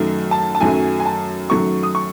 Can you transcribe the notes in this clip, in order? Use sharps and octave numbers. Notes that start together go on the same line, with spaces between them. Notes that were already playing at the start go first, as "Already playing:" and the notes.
Already playing: F#2 D#3 F#3 A3
A5
A5
F#2 D#3 F#3 A3 G#5
G#5
A5
F#2 D#3 F#3 A3 C#6
D#6
C#6